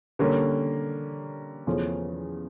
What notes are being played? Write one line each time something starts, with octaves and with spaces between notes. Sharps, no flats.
D3 G3 A#3 C#4
E2 C#3 F3 A3 C#4